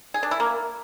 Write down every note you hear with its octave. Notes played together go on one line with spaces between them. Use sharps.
G#4
D4
E4
A#3